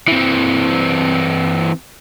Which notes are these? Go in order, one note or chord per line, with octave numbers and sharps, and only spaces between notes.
E3 C4